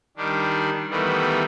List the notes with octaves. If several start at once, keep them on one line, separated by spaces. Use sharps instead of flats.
D#3 G3 D4
D#3 E3 G3 A3 B3